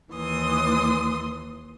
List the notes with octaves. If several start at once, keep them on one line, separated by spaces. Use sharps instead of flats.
D#2 E3 C6 D#6